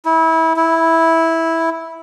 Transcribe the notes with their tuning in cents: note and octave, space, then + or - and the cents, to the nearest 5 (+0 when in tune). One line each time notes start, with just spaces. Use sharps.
E4 -25
E4 -10